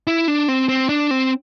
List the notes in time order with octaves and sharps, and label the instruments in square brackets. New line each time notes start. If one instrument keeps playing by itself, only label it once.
[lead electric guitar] E4
D4
C4
C4
D4
C4